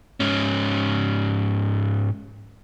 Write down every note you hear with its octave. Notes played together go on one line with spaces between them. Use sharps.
G#2 C#4